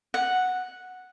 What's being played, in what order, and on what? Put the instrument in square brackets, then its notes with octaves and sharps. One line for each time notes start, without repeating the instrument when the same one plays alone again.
[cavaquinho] F#5